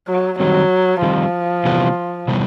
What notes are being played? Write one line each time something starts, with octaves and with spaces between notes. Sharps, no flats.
F#3
D#3 F#3 G3 C4
D#3 F3 G3 C4
C3 E3 G3 B3
C3 E3 G3 B3